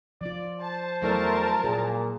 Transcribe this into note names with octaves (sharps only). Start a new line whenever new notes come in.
F3 F4 D5
C5 A5
E2 F#3 A3 E4 A#4 D5 A5
A#2 G#4